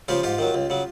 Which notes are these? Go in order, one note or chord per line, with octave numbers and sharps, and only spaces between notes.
C#3 F3 F4 G4
G#2 F4 G4
D#3 F#3
C#2
C#3 F#3